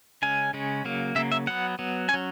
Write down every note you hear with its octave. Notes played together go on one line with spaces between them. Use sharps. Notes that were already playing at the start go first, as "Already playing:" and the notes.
C#3 G#3 C#4 G#5
C#3 G#3 C#4
C#3 F#3 A#3
C#3 F#3 A#3 E5
E5
F#3 B3 F#5
F#3 B3
F#3 C#4 G#5